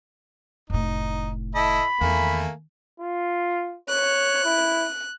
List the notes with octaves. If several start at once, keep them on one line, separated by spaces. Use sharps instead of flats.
F1 A2 D#4
E4 A4 D#5 B5
E2 D#3 A3 A#3 G#5
F4
C#5 F#6
E4